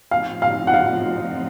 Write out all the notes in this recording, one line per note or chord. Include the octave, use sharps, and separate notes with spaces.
A2 F3 C4 D#4 F5
F5
F#5
F5